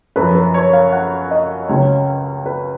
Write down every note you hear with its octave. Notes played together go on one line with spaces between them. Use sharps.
F#2 F3 B4
B4
C#5
F5
F#5
D#5
C#2 C#3 F#3 C#5
B4